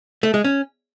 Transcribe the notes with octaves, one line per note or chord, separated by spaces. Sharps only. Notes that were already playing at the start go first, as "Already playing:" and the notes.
A3
G#3
C#4